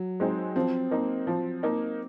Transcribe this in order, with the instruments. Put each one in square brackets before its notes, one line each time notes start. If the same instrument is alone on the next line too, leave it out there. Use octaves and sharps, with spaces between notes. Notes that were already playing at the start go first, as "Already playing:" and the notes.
Already playing: [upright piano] F#3
[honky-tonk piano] G#3 C4 D#4
[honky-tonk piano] F3 [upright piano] C4
[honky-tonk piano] A#3 D#4
F3
A#3 D#4